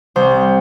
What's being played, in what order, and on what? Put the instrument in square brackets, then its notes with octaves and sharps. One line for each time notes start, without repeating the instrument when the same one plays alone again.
[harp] C2 C5